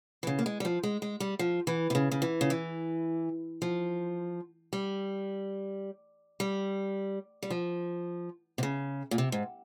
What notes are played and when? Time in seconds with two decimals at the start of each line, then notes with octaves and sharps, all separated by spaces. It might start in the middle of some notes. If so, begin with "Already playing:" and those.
0.23 E3
0.27 C#3
0.39 A#3
0.46 G#3
0.60 G3
0.65 F3
0.83 G#3
1.02 G#3
1.20 G3
1.39 F3
1.67 E3
1.90 C3
1.95 C#3
2.11 C#3
2.22 E3
2.41 C#3
2.50 E3
3.62 F3
4.73 G3
6.40 G3
7.43 G3
7.50 F3
8.58 C3
8.63 C#3
9.11 A#2
9.18 C3
9.32 G#2